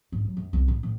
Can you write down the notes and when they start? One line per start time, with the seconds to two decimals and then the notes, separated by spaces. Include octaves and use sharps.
0.12 G#2
0.25 F#3
0.37 F#2
0.53 C2
0.68 G#2
0.83 A2